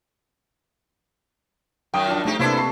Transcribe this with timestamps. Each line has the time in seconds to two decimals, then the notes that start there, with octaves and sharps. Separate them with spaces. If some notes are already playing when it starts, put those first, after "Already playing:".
1.94 F#2 D#3 G5 D#6
2.06 F3 D4
2.25 C3 A3 D#4 G4
2.39 C3 A#3 B3 D4 E4 A4 C5
2.57 A5 C#6 C7